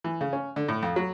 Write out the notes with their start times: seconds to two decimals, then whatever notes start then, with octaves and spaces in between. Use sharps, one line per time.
0.04 E3
0.21 C#3
0.33 C#4
0.56 D3
0.69 A2
0.83 F2
0.96 F#3